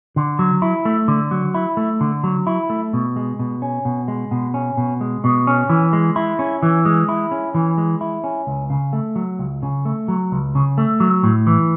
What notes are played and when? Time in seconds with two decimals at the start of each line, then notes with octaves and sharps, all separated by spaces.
0.16 D3
0.39 F#3
0.62 E4
0.85 A3
1.08 D3
1.31 F#3
1.54 E4
1.77 A3
2.01 D3
2.24 F#3
2.47 E4
2.70 A3
2.93 B2
3.16 G#3
3.39 B2
3.62 C#4
3.85 B2
4.08 G#3
4.31 B2
4.54 C#4
4.77 B2
5.01 G#3
5.24 B2
5.47 C#4
5.69 E3
5.93 G#3
6.16 E4
6.39 C#4
6.63 E3
6.85 G#3
7.09 E4
7.31 C#4
7.54 E3
7.78 G#3
8.01 E4
8.24 C#4
8.47 C#2
8.70 C#3
8.93 A3
9.16 F#3
9.39 C#2
9.63 C#3
9.85 A3
10.08 F#3
10.32 C#2
10.55 C#3
10.78 A3
11.00 F#3
11.24 A2
11.47 E3